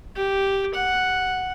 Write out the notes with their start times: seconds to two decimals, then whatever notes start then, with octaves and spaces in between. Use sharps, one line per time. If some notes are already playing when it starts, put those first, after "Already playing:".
0.16 G4
0.74 F#5